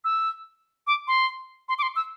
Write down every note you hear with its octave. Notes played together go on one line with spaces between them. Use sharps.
E6
D6
C6
C6
D6
C6
E6